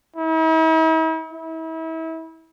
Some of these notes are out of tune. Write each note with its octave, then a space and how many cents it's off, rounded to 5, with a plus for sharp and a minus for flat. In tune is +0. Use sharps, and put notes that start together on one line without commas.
E4 -45
E4 -35